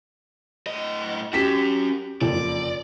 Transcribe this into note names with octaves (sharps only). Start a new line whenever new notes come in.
A2 D#5
C#4 F#4 G4 B6 E7
F#1 F2 D5